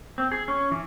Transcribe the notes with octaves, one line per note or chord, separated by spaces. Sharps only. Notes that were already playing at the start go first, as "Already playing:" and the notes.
C4
G#4
C#4
E3